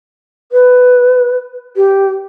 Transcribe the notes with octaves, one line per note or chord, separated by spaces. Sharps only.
B4
G4